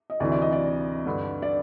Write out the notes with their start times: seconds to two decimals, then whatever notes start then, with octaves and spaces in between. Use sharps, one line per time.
0.10 D#5
0.20 D2 C3 E3 D5
0.32 D5
0.41 D#5
0.52 D5
1.06 G2 D3
1.42 D5